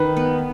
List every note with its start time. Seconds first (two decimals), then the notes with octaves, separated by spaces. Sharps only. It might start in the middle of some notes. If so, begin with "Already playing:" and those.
Already playing: D#3 B4
0.17 B3